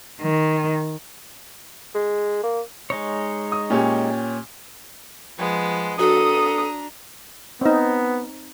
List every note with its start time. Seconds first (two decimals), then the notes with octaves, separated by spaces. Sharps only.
0.21 D#3
1.95 G#3
2.43 A#3
2.90 G#3 D#4 C#5
3.52 D#6
3.70 A#2 C#4 G4
5.37 F3 G#3 B3
5.99 D4 F#4 A4 A#5 D#6
7.61 B3 C4 D#4